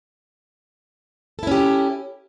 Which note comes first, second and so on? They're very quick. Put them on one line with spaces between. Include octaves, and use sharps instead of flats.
A4 E4 C#4 G4